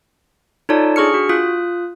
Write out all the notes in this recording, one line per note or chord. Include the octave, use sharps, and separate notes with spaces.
D#4 F4 A4 C#5 D5 A5
D4 G#4 C#6 F6 C#7
F#4
F4 D#6 F#6